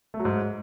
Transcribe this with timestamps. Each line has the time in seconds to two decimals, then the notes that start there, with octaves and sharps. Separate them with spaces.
0.14 A3
0.19 F#3
0.25 G#2